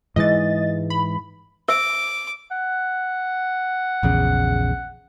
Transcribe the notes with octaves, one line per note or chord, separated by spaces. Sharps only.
G#2 E3 G#3 D#5 A6
B5
C5 E5 D6 E6
F#5
A#1 E2 C#3